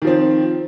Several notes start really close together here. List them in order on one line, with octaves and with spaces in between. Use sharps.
D#3 F3 C4